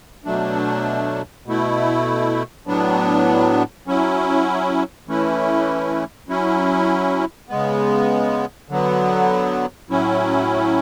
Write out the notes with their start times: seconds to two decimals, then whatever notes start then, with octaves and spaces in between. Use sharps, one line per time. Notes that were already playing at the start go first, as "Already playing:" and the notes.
0.25 B2 F#3 A3 D4
1.46 B2 A3 E4
2.67 A2 F#3 B3 D4
3.87 F#3 C#4 E4
5.08 E3 A3 C#4 E4
6.28 F#3 C#4 E4
7.49 C#3 G#3 B3
8.69 D3 F#3 B3
9.90 A2 F#3 C#4 E4